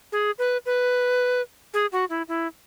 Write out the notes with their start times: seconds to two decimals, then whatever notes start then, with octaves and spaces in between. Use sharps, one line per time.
0.12 G#4
0.39 B4
0.66 B4
1.74 G#4
1.92 F#4
2.10 E4
2.28 E4